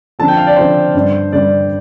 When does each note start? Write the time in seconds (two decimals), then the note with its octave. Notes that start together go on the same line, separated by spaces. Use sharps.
0.19 D3 F3 C4 A5
0.28 G5
0.37 F5
0.47 D5
0.56 D3 F3 C4 C5
0.94 G2 D3 G3 D4
1.32 G2 D3 G3 D4 D5